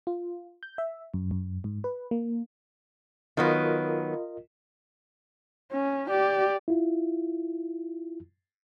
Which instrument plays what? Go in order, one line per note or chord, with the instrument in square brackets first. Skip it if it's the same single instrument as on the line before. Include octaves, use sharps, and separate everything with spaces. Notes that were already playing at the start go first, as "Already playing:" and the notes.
[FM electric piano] F4
G6
E5
F#2
F#2
G#2
B4
A#3
[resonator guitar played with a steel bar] D#3 F#3 B3 [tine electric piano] F4 A#4 D#5
[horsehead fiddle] C#4
G4 D5
[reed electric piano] E4 F4